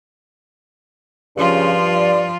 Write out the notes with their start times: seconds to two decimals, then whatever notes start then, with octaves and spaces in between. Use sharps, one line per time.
1.37 G2 C#3 F3 F4
1.96 D5